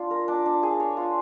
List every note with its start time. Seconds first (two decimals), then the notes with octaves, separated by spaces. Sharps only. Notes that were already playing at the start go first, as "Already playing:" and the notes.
Already playing: D4 F4
0.11 A#4
0.28 D4
0.46 D4
0.63 G#4
0.80 C#5
0.97 F4